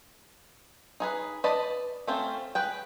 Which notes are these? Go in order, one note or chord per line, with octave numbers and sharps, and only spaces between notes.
D#4 G#4 B4
B4 D5 D#5 A5
A3 C4 C#4 F4
G#4 B4 G5